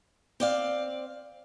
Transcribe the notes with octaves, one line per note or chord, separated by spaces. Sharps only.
C4 D5 F5